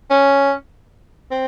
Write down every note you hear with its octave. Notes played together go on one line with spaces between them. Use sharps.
C#4
C4